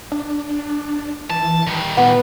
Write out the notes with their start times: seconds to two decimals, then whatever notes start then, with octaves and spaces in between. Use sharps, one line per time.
0.12 D4
1.30 E3 A5
1.67 D#3 G3
1.97 A#2 B3 F#5